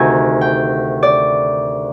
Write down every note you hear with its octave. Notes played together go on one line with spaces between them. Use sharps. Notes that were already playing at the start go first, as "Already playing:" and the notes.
Already playing: D2 C3 D#3 G#5
G5
D5